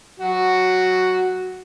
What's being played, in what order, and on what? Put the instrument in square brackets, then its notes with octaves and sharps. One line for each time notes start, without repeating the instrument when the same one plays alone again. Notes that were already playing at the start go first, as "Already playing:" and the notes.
[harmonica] F#3 F#4